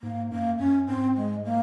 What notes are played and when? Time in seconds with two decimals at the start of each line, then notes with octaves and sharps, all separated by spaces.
0.02 G#2 A#3
0.31 F#2 A#3
0.59 F#2 C#4
0.88 G#2 C4
1.16 G#3
1.45 A#3